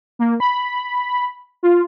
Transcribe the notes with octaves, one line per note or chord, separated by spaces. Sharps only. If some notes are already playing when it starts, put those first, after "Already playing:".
A#3
B5
F4